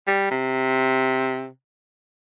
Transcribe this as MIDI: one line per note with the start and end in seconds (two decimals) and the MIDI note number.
0.07 0.29 55
0.31 1.48 48